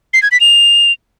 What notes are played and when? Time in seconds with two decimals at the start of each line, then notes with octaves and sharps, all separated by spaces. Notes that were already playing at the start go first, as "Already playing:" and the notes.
0.14 C7
0.23 G#6
0.32 B6
0.41 F7